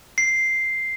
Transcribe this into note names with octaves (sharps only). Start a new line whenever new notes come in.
C7